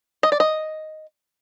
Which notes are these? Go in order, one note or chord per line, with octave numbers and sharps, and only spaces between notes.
D#5
D5
D#5